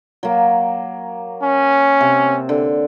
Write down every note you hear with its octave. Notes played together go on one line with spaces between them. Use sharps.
F#3 A#3
C#4
C3
D3